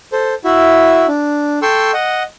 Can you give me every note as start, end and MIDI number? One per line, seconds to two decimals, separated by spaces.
0.12 0.34 69
0.12 0.34 72
0.44 1.06 64
0.44 1.06 66
0.44 1.06 76
1.08 1.59 62
1.62 1.92 69
1.62 1.92 79
1.62 1.92 84
1.62 1.92 85
1.62 1.92 88
1.93 2.23 75
1.93 2.23 78